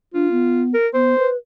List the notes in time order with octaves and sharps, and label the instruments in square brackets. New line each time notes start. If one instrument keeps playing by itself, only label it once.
[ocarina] D4 [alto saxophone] F4
[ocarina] B3
[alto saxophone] A#4
[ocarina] B3 [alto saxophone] C5
[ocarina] B4